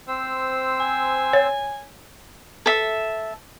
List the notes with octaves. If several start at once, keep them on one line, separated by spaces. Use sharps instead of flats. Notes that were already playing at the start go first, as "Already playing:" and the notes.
C4 C5 E6
G#5
C#5
A4 E5